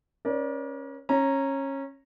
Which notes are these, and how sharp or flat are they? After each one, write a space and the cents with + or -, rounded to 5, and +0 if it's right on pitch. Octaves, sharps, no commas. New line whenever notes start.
C#4 -10 A#4 +45 D5 +0
C#4 -20 A#5 +0